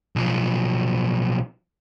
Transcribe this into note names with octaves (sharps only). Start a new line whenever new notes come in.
B1 F3